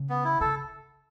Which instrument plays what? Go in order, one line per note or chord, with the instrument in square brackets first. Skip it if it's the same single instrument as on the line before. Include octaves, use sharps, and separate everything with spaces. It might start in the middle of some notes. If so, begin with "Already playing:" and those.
Already playing: [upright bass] C#3
[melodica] B3
E4
[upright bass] C#3 [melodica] A4